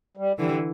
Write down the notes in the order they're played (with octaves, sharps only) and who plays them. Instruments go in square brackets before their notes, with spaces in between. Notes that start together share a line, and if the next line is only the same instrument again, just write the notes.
[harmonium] G3
[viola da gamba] D3 E3 [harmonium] G3